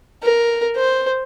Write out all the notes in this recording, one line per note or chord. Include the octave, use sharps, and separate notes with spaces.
A#4
C5